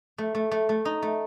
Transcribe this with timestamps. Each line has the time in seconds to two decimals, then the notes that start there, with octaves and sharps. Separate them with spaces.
0.18 A3
0.35 A3
0.51 A3
0.69 A3
0.85 D#4
1.02 A3